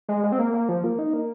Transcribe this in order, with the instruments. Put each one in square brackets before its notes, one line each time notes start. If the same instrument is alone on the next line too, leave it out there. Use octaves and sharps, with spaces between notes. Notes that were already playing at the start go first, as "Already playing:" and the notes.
[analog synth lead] G#3
G#3
C4
A#3
A#3
F3
A#3
D#4
A#3